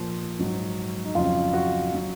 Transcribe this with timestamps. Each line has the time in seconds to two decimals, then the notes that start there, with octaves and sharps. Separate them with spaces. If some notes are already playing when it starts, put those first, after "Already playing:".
Already playing: A#2 F3
0.39 G#2 F#3
1.05 D#4
1.15 F2 C#3 F#3 F4
1.54 F#4
1.95 F#3